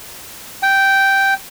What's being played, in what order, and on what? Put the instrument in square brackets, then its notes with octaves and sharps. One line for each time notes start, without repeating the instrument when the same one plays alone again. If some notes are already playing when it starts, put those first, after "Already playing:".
[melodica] G5